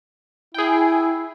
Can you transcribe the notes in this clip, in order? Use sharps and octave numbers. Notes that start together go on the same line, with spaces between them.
E4 G#4 G5